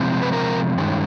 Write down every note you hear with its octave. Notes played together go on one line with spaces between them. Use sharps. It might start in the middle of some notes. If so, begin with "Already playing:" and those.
Already playing: C3 F3 G#3 C4
B4
A#4
G2 D#3 G#3 C#4